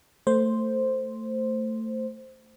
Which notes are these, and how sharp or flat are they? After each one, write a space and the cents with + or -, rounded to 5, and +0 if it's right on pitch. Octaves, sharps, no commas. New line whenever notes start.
A3 +20 C5 +0